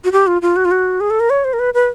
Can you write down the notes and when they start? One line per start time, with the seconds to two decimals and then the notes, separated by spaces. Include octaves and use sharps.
0.04 F#4
0.12 G4
0.27 F4
0.42 F4
0.56 F#4
0.65 F4
0.71 F#4
1.00 G#4
1.10 A4
1.20 A#4
1.30 C#5
1.44 C5
1.53 A#4
1.59 B4
1.74 B4